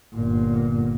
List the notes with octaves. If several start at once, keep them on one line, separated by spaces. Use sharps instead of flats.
G1 A#2